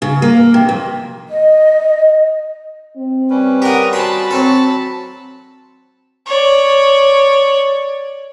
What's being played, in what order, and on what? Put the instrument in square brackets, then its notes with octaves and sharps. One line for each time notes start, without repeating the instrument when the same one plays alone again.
[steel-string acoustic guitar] C#3
A#3
C3
F2
[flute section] D#5
[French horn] C4
[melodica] G3 C#4 B4
[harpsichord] G4 F#5 [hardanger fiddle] A#4 D#6
[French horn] F#4 [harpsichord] C5 G#5 [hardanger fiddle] A5 B5
[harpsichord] F#3 C4 A4
[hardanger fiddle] C#5 D5